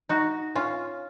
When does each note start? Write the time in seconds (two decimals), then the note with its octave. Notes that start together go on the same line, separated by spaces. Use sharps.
0.09 D#4 F#4
0.55 C#4 F4